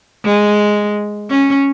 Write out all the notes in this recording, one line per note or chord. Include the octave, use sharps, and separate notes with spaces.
G#3
C#4